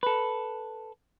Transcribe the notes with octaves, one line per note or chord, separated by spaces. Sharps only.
A4 B4